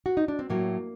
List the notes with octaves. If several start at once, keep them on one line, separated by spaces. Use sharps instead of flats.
F#4
D#4
D4
C4
A2 F#3 A#3